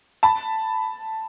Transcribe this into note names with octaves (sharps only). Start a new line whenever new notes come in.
A5 B5